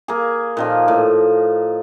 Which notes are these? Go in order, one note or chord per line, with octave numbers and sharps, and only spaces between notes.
A#3 G#4
A#2 D#3 F3
A2